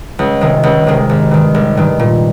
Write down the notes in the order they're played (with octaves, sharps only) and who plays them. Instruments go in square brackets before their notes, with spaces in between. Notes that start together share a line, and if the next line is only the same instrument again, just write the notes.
[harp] C#2
C3 D#3 G#3
C#2
C3 D#3 G#3
G#1
G2 D#3
G#1
G2 D#3
A#2